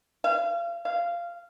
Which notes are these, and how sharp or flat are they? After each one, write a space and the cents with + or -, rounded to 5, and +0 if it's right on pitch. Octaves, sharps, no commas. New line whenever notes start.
F5 -35
F5 -15